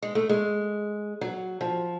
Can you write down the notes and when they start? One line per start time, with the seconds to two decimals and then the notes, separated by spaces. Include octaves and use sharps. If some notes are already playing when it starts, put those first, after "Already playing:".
0.02 G#3
0.15 A3
0.29 G#3
1.21 F#3
1.61 F3